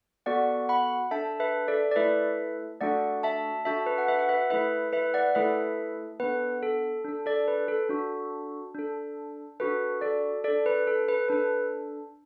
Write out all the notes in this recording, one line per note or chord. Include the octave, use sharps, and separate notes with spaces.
B3 F#4 A4 D5 F#5
F#5 B5
D4 A4 E5 A5
B4 E5
A4 D5
D5
A3 E4 A4 B4 E5
A3 D4 F#4 A4 D5 F#5
E5 A5
D4 F#4 A4 E5 A5
B4
F#5
B4 E5
F#5
B4 E5
A3 E4 A4 B4 E5
B4 E5
D5 F#5
A3 E4 A4 B4 E5
B3 D4 A4 B4
A4
D4 A4
A4 D5
B4
A4
D4 F#4 A4
D4 A4
D4 F#4 A4 B4
A4 D5
D4 A4 D5
B4
A4
B4
D4 A4 B4